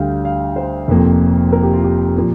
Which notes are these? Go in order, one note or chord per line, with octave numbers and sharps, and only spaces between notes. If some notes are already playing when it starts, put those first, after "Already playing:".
Already playing: D2 D3 G3 F5 G5
F5
C5
F1 F2 F3 A#3
A#4
G4
F4
G4
A#2 F3 A#3